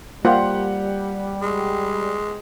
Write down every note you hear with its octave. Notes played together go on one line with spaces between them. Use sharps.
G3 A#3 F4 G4 C5 F#5
G#3